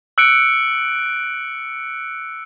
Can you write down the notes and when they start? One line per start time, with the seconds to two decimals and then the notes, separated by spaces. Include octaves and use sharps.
0.18 E6 F#6 C#7 D7